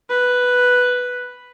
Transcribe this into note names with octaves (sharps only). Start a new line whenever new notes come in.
B4